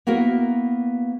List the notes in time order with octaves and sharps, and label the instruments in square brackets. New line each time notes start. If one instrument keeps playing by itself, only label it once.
[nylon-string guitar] A#3 B3 E4 F#4 A#4